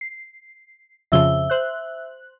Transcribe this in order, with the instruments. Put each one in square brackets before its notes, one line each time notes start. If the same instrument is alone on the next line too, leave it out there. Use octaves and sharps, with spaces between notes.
[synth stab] C7
[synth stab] F2 C#3 F3 [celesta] E5 E6 G7
[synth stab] C5 F#6